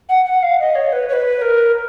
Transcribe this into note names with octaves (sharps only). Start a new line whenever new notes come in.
F#5
F#5
F5
D#5
C#5
B4
C#5
B4
A#4